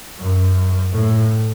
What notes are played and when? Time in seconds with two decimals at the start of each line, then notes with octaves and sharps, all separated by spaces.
0.19 F#2
0.93 A2